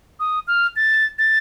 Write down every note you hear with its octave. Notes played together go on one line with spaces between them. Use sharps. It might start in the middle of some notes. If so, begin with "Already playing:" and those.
D#6
F6
A6
A6